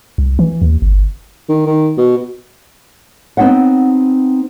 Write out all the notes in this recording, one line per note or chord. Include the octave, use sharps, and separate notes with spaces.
C2
E3
D#2
G1
D#3
D#3
B2
B3 C4 D4 D#4 C#5 F#5